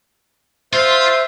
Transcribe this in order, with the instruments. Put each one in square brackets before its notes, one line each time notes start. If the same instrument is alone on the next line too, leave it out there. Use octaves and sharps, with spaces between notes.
[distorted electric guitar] F4 [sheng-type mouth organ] C5 E5 C6